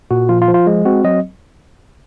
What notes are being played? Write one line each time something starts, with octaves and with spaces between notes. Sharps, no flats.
A#2 F#4
F3 F4
F4
F3
F4
G#3
C4 F#4
F#3 D#5